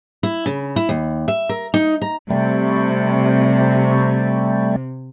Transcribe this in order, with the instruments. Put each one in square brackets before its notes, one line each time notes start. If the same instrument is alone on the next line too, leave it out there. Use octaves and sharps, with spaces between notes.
[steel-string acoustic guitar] E4
C#3
E4
D#2
E5
A#4
D#4
A#5
[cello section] C3 [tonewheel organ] G3 A3